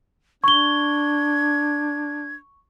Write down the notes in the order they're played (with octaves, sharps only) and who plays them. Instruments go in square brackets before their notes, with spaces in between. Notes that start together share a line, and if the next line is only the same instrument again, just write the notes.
[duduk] D4 [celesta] C#6 G7 [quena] G#6